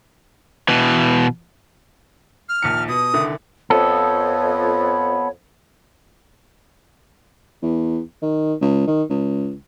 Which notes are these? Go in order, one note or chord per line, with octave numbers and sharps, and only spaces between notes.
B2 E3
F6
A#1 D#2 C#7
B2 D#6
C2 D3 D#3
F2 B3 A4 C#5
E2
D#3
C#2
D#3
C#2